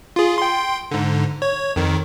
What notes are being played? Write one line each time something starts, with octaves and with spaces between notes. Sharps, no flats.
F4 G#4
G5 C6
G#2 D3
C#5
F2 D#3